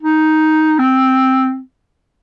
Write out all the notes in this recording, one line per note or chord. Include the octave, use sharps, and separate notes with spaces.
D#4
C4